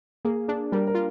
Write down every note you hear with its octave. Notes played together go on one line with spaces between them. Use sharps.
A#3 G#4
D4 G#4
G3 A#4
A#4
F4